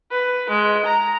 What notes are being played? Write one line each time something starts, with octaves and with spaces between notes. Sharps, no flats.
B4
G#3
A#5